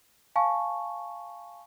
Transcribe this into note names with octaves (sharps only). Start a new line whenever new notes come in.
F5 G#5 A5 C#6